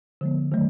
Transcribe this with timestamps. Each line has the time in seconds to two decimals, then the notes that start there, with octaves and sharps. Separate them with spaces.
0.21 D3 F3 G#3 B3
0.52 D#3 F#3 A3